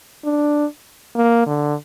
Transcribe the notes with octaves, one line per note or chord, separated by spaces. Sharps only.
D4
A#3
D3